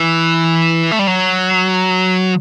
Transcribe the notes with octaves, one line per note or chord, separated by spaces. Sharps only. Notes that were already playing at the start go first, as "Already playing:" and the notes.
Already playing: E3
A3
G3
F#3